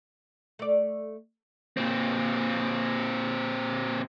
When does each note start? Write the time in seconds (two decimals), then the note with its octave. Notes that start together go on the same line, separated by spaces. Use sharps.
0.59 A3 D5
1.77 A#2 C4